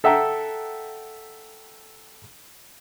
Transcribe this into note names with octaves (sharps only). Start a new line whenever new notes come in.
A4 E5 F#5 G5 A#5